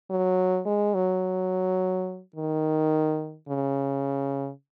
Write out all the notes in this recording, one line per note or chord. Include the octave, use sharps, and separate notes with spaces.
F#3
G#3
F#3
D#3
C#3